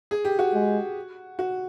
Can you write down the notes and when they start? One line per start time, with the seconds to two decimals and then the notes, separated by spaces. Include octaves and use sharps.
0.11 G#4
0.25 G4
0.39 F#4
0.53 G#3
1.39 F#4